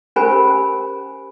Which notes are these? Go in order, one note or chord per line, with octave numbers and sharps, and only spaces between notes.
C#4 G4 A#4 C5 G#5 B5